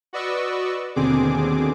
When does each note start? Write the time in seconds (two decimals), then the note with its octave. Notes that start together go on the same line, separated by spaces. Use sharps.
0.13 F#4 B4 D5 D#5 C#6 E6
0.95 D#2 B2 D3 C4 G#4 D6